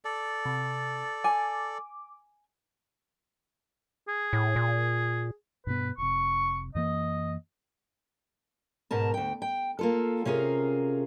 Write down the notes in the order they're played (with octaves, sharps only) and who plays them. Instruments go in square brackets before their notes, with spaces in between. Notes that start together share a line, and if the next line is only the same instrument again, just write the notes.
[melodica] A4 D5
[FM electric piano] C3
[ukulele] G#5 [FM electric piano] D6
[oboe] G#4
[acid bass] A2
A#2
[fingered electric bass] G2 B2 B3 [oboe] B4
[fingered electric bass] F1 C3 [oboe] C#6
[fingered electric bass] F#2 E3 A#3 [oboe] D#5
[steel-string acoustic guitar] G#2 B2 A#4 A5
D2 G5
G5
A#3 F4 A4
C3 C#4 F4 G#4 A#4